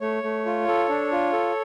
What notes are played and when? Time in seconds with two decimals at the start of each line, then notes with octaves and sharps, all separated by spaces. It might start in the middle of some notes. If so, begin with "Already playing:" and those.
0.01 A3 C#5
0.23 A3
0.46 F4
0.68 A4
0.89 D4
1.12 F4
1.33 A4